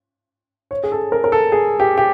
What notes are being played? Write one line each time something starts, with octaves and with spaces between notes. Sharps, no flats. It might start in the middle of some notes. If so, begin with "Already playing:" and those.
C#5
G#4
A4
A#4
A#4
A4
G#4
G4
G4